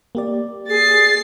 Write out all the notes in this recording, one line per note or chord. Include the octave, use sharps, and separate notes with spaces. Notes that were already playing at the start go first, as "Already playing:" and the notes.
A#3 G4 D5
G#4 A6 C7